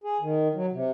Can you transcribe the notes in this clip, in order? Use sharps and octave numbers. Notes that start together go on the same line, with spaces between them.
G#4
D#3
F#3
C3